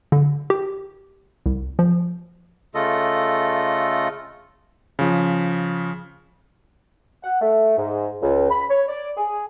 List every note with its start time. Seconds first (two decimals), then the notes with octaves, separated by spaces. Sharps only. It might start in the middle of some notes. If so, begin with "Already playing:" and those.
0.12 D3
0.50 G4
1.46 C2
1.79 F3
2.75 C#3 A3 F4 A4 D#5
4.99 C#3 F3
7.23 F#5
7.41 A3
7.78 G#2
8.22 C#2
8.51 B5
8.70 C#5
8.88 D5
9.17 G#4